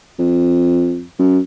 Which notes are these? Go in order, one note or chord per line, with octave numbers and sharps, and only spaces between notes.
F2
F#2